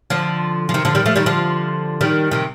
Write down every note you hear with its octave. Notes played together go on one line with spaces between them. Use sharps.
D3 F3
F3
C3 D#3
D3 F3
D#3 G3
F3 A3
D#3 G3
D3 F3
D#3 G3
C3 D#3